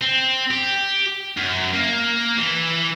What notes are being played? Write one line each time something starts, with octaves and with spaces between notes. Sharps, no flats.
C4
G4
F#2
A#3
E3